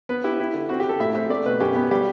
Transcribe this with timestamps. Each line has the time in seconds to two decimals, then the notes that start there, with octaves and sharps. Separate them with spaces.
0.09 B3 B4
0.24 E4 G4
0.40 E4
0.54 D3
0.69 C4 F#4
0.80 G4
0.84 C4
0.89 A4
1.00 A2 E5
1.15 C4 E5
1.30 A3 D5
1.46 B2 B4
1.60 F#2 G4
1.76 B3
1.91 G3 G4